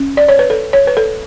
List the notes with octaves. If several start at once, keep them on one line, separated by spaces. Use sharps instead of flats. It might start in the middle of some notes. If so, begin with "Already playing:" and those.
Already playing: C#4
D5
C#5
B4
A4
C#5
B4
A4